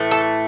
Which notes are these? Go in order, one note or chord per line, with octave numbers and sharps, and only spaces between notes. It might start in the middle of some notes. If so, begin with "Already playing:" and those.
Already playing: A2 E3 A3
A4